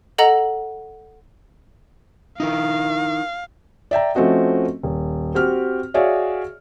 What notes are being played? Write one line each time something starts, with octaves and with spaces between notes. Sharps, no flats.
A4 D#5 F#5 A#5 F#7
D#4 E4 A#4 F5
D5 E5 G5 A#5
F3 A3 C4 C#4 F#4 D#5
D#1
C4 F#4 G4 F6
F#4 G#4 C#5 D5 E5 F5